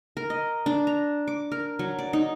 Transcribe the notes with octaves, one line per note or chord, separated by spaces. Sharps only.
A#4
D#5
D4
A#5
D6
A#4
F#3
D5
D#4